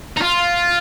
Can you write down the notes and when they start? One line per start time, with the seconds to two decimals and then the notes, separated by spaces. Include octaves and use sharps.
0.17 D#4
0.21 F4